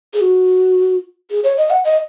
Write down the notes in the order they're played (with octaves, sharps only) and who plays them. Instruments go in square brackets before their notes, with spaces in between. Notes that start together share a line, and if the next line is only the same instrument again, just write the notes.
[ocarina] G#4
F#4
G#4
C#5
D#5
F#5
D#5